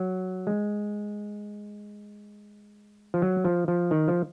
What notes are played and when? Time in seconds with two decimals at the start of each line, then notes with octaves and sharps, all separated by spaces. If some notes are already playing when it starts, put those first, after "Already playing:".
Already playing: F#3
0.47 G#3
3.14 F3
3.22 F#3
3.45 F3
3.68 F3
3.91 D#3
4.08 F3